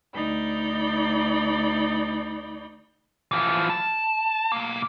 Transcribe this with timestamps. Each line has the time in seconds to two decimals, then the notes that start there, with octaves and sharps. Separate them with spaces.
0.14 D2 D#4 D5 B5 G6
3.31 E3 F3
3.70 A5
4.52 B1 A#3